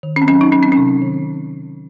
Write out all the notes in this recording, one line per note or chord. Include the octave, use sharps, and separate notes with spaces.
D#3
C#4
C4
F#3 C#4
D#4
F#3 C#4
C4
C3 C#4
D#3